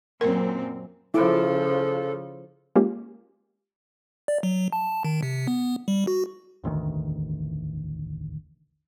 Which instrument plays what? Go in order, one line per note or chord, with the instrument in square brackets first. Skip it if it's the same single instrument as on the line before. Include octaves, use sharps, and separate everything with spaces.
[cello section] F#2 A#2 C4 [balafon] A#4
[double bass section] C#3 F3 [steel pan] E4 D6 [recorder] A4
[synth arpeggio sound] G#3 A#3 C#4 F4 G4
[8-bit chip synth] D5
F#3
A5
D#3
C3
B3
G3
F#4
[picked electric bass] E1 A1 D2 D#3